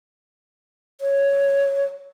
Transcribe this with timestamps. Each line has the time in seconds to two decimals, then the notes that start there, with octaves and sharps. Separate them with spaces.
1.01 C#5